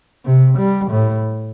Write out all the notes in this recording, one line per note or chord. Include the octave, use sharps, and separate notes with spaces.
C3
G3
A2